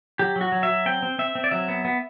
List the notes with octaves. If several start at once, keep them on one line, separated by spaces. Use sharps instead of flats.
F#3 G4
F#3
F#4
F#3
E5
F#3
C4 G5
C4
C4 E5
C4
D5
F#3 E5
B3
B3